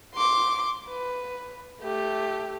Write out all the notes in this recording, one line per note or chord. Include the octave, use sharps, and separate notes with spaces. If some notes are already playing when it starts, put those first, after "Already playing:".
C6 D6
B4
A3 G4